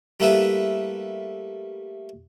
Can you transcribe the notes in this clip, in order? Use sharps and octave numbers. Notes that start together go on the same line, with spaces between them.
G3 A3 A#3 E4 B4 E5